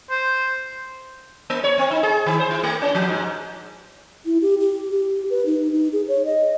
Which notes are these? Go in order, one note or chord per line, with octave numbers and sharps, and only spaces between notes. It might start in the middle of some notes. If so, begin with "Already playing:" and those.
C5
A#3
C#5
C4
D#4
G#4
D#3
C5
E4
A3
C#4
F3
G#2
E4
G4
G4
G4
B4
D#4
D#4
G#4
C#5
D#5